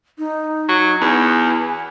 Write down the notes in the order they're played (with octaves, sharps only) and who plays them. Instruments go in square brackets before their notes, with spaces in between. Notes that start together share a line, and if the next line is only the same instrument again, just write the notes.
[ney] D#4
[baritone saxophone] F#3
[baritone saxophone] E2 [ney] G#5